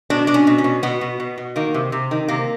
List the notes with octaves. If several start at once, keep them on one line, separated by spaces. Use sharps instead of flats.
B2 D4
B2 D4
C#4
B2
C#4
B2
B2 B3
B2
B2
B2
D#3 A#3
C3
C3
D#3
C3 A#3